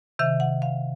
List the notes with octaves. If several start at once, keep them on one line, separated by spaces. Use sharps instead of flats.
C3 D#3 E5
F#5
F5